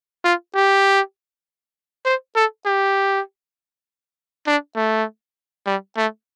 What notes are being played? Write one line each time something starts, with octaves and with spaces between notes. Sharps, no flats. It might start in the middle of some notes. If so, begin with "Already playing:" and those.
F4
G4
C5
A4
G4
D4
A3
G3
A3